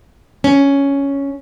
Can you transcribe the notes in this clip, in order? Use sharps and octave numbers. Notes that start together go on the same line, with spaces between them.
C#4